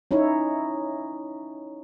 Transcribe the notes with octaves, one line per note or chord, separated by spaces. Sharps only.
C#4 D#4 E4 C#5